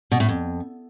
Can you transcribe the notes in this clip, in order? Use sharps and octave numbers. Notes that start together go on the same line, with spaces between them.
B2
A2
F2